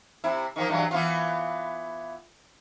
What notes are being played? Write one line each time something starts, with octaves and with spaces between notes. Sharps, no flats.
C3 E4
D#3 F3 A#3
G2 E3 F#3
E3 B3 F4